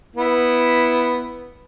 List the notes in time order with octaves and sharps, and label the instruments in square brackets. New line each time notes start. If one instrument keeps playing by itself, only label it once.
[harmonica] B3 E4